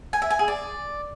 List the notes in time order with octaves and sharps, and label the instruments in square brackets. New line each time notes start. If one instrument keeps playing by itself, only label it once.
[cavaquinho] G#5
E5
G#5
G#4
D5